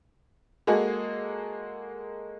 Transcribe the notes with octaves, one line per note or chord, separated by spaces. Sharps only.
G#3 A#3 F#4 G#4 A4